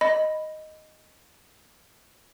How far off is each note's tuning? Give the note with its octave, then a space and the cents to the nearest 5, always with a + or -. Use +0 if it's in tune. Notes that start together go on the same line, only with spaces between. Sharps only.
D#5 +0 B5 +0